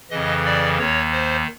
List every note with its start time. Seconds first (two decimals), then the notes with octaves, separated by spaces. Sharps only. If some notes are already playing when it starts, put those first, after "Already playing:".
0.11 F2 C#3 E3 D#5
0.45 D5
0.79 D#2 D#3 C#5
1.13 C5